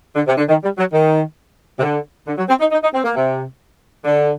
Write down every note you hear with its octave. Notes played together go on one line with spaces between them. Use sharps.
D3
C3
D3
D#3
G3
F#3
D#3
C3
D3
D3
F#3
C4
D#4
D#4
D#4
C4
A#3
C3
D3